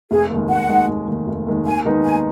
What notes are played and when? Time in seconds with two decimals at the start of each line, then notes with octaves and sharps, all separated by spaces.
0.11 F1 G#4
0.30 D#2 D#3 G#3
0.49 F1 F#5
0.69 D#2 D#3 G#3
0.88 F1
1.08 D#2 D#3 G#3
1.27 F1
1.47 D#2 D#3 G#3
1.66 D#2 G#5
1.85 D#3 G#3 B3 D#4
2.05 D#2 G#5